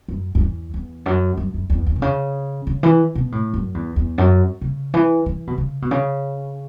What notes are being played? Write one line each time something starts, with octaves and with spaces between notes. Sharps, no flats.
F#2
F#2
E2
E2
F#2
F#2
F#2
E2
E2
B2
C#3
C#3
E3
B2
A2
F#2
E2
E2
F#2
C#3
E3
E3
B2
C#3
B2
C#3